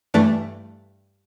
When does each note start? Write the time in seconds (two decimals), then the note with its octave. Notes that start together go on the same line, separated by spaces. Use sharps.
0.14 G2 E3 A3 D4